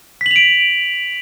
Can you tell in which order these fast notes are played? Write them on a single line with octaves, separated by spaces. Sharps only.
B6 F#7 F7 D7